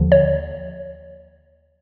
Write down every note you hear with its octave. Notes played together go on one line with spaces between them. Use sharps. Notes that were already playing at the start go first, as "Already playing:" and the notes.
Already playing: D#2 D3 F3
C#5